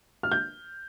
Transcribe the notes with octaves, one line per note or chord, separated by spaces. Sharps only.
F6
G6